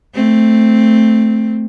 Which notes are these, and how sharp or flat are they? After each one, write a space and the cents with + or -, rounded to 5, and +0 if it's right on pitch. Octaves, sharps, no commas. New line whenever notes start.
A3 +0 C4 +0